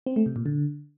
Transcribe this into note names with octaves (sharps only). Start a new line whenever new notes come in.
C4
A3
C3
A#2
D3